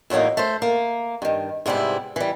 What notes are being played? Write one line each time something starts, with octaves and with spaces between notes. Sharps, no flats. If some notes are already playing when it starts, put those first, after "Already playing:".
E2 A2 F#3 A#3 D#4
A3 C5
A#3
G2 D#3
G#2 C3 G3 B3 E4
E3 G3